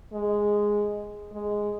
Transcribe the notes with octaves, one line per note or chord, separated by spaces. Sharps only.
G#3
G#3